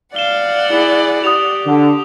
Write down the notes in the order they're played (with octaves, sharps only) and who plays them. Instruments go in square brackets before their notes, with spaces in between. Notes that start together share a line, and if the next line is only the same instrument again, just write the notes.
[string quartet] D5 F#5 [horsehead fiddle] F5 [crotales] E7 G7
[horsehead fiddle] E4 G#4
[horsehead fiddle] G4 [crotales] D#6 F7
[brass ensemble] D3